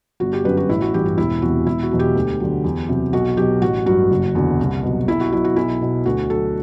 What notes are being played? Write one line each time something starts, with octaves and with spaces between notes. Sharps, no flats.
G1 F#4
G4
F#2 D3 F#3 B4
F#4
A1 E4
F#4
G2 E3 G4
F#4
E1 E4
E2 C3 E3 F#4
E1 E4
F#4
E2 B2 F#3
G4
D2
D3 F#3
E2
C3 F#3
B1 F#4
B2 F#3 G4
A1 F#4
G2 F#3 F#4
F#1
E2 D3 F#3
C2
B2 F#3
B1 E4
F#4
B2 F#3 E4
F#4
B1 E4
B2 F#3
D2 F#4
D3 F#3 A4